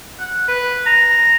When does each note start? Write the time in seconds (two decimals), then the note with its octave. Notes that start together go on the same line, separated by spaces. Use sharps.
0.19 F#5
0.48 B4
0.86 A#5